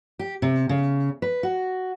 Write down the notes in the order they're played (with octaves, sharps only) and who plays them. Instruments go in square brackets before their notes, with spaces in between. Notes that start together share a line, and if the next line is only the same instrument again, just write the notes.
[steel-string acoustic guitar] G4
C3
C#3
B4
F#4